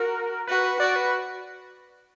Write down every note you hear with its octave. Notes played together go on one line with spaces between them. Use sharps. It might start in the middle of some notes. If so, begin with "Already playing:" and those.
Already playing: F#4 A#4
F#4 B4
F#4 D5
B4